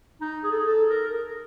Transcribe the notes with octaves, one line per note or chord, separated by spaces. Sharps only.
D#4
G#4
A4
G#4
A4
A#4